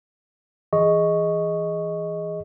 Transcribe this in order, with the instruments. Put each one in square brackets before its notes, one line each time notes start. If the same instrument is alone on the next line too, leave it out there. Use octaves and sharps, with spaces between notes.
[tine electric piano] E3 G#4 D#5 C#6